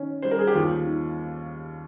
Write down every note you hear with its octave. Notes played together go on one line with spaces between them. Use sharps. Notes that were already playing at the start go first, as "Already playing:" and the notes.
Already playing: D#3 C#4
G3 C5
A#4
G#4
G4
D#2 F4
D#3